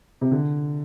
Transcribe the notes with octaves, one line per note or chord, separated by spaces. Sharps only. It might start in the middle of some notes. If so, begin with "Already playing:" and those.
C3
D3